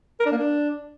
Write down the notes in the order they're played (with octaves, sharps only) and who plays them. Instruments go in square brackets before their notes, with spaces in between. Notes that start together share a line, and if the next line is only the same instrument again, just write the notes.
[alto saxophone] A#4
D4
A#3
D4